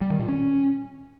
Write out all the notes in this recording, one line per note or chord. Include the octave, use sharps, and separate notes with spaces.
G3
D#3
A#2
C#4